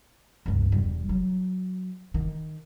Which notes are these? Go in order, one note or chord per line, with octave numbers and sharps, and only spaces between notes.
C#2 G2
E1 G3
F#3
D#3